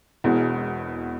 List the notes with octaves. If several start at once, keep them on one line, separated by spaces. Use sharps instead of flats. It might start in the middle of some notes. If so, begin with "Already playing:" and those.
E1 E2 B2 G#3